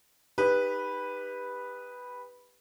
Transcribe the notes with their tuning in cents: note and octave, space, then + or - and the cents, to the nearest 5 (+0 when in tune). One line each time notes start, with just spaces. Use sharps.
D#4 +0 G4 +25 B4 -5